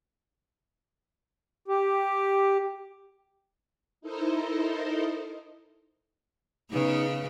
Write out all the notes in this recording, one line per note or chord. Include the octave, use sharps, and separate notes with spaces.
G4
D#4 E4 A4 A#4 C5 D#5
C#3 B3 D#4 B4